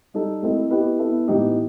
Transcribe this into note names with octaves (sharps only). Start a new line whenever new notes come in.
G3 D#4 A4
A3 C4 E4 A4 D#5
B3 E4 G4 B4 D#5
B3 E4 A4 E5
A2 E3 B3 D#4 G4